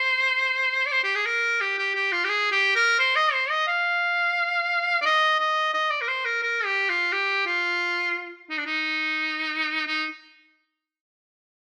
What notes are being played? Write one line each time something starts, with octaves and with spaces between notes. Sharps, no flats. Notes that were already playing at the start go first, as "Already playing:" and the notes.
Already playing: C5
D5
C5
G4
G#4
A#4
G4
G4
G4
F4
G4
G#4
G4
A#4
C5
D#5
C5
D#5
F5
D5
D#5
D#5
D#5
D5
A#4
C5
A#4
A#4
G4
F4
G4
F4
D#4
D4
D#4
D#4